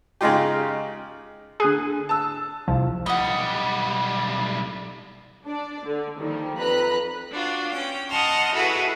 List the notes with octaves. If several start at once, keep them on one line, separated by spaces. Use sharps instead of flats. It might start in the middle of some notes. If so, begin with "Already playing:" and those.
C#3 G#3 D#4 F4 G4
D3 G#4 F#6 D#7
A5 E6
C2 F3
B1 G3 D#5 F#5
D4 D5
D3
D#3 F3 G3 A#3
F2 F3 B4 A#5 B5 F#6
D4 F4 F#4
C#4 G5
D#5 F#5 A5 A#5 C6 F6
E4 F#4 G#4 A4 B4 F#5